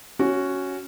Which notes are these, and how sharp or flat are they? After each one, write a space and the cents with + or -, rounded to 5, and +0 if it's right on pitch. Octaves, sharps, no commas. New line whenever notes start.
C#4 +0 F#4 +0